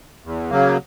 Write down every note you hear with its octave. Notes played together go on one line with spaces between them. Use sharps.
E2
C#3 F#3 A#3